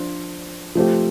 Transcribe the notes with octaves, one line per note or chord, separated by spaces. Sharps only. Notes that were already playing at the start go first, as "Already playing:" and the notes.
Already playing: F3 D4 F4 C5
F3 A3 C4 G4